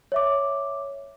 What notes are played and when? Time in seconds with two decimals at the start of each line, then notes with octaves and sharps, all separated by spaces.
0.12 C#5 E5 D6